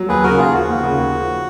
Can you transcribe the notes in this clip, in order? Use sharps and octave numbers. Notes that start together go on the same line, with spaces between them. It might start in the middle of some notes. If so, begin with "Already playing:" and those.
Already playing: F#3
D#2 G#4 B4
C#3 F#4 A#4
D#2 F4 G#4
F3 F#4
D#2
C#3
D#2
F3